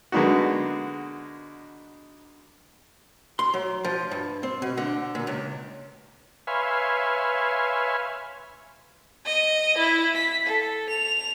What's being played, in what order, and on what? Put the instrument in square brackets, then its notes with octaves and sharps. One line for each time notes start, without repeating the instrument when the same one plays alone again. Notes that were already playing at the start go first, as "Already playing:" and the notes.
[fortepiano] D3 G#3 A#3 B3 D#4 F#4
[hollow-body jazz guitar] C6
F#3
F3
G2
C4
B2
D3
A#2
C#2
[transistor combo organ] B4 C#5 E5 F5 G#5 C6
[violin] D#5
E4
B6
A4
F7